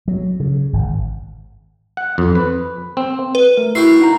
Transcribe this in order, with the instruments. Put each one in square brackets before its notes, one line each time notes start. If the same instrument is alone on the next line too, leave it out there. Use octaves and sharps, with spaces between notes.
[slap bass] F#3
C#3
G#1
[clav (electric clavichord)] F#5
F2
B4
C4
[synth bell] B4
[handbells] A3 A#4
[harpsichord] E4 F#4 G5 [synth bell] C7
[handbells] D#4 F#5 A#5